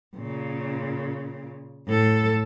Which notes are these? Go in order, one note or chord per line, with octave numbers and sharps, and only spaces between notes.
A#2 C#3
A2 A4